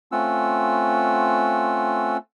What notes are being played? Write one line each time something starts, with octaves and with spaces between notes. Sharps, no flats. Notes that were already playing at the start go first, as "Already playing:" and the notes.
A3 C4 C#4 F4 F#5 E6